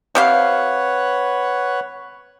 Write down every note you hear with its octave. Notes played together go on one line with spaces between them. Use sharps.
C3 G4 B4 C#5 F5 F#5